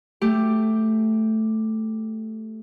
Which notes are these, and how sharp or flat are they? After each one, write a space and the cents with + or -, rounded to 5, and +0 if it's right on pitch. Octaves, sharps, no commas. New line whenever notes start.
A3 +0 G4 +0